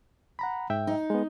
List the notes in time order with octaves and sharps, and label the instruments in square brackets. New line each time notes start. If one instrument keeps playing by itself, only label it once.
[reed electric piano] F#5 A#5 B5
G#2 E5 G5
[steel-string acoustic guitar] D#4
[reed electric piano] G#3 B3